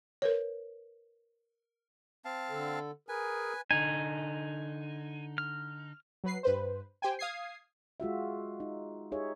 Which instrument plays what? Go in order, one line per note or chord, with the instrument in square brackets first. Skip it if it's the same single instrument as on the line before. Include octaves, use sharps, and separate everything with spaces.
[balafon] A#4 B4 C#5
[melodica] C4 F5 A5
[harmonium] D3 A4
[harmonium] G#4 A#4 [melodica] B4 G#5
[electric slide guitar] D3 D#4 [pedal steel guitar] G#5
[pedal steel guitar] F6
[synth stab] F#3 B4 C7
G2 B4 C5
G4 C5 G5 G#5
F5 D#6 G#6 C7
[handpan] G#3 F4 F#4 E5
D#4
D#4 G4 G#4 C#5 E5